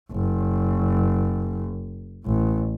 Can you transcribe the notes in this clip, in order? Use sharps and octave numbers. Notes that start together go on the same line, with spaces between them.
F#1
A1